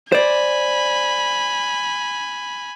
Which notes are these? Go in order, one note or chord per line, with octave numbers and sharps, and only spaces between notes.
C5 D5 G#5 B5